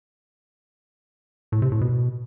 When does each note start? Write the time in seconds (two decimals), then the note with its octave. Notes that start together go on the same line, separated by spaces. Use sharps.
1.52 A2
1.62 C3
1.72 A2
1.81 B2